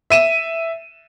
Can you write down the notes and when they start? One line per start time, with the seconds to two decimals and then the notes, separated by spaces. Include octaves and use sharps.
0.10 E5 D#7 E7